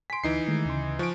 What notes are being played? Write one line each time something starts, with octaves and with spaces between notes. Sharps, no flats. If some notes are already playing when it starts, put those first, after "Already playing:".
G#5 C6 B6 D7
D2 E3 D#4 C7
D#3 G#3 A3
D2 C#3 C6
F3 G#5 C#6 F#6 D7